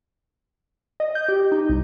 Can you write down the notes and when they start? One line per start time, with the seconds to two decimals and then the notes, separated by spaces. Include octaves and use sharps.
1.00 D#5
1.15 G6
1.29 G4
1.52 D#4
1.69 C2